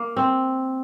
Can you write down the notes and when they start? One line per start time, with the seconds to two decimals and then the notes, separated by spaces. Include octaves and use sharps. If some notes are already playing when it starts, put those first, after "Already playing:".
Already playing: A#3
0.17 C4